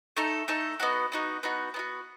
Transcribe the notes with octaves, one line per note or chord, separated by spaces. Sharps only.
A3 D#4 A4
A3 D#4 A4
B3 D#4 F#4
B3 D#4 F#4
B3 D#4 F#4
B3 D#4 F#4